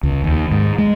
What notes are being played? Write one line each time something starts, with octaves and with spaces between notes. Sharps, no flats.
C#2
D#2
G#2
G#3